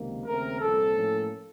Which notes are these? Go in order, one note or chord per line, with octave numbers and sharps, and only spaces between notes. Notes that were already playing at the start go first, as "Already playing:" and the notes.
Already playing: C#2 C3 D#3 A#3
D#2 C#3 A3 C4 A#4
C2 A#2 F3 C4 A4
A2 F3 A#3 C#4